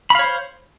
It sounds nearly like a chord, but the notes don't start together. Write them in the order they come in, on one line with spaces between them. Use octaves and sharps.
B5 F5 C#5 C5